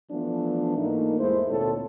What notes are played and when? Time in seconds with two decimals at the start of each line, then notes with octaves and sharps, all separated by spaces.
0.10 E3 F3 A3 B3 D4
0.77 G#2 E3 A3 A#3 D#4
1.19 E2 G#3 A3 E4 C5
1.49 D2 A#2 C4 A4 C#5